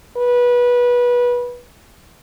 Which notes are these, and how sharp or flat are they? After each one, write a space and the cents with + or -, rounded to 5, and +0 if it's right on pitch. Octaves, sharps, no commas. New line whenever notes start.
B4 -20